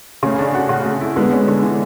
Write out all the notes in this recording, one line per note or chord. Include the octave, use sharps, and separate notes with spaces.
C#3 A3 C#4
D4
F#4
C#3
A3
E4
D3 G#3 B3
C#4
D3
E3